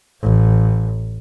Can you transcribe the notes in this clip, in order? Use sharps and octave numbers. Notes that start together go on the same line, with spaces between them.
A1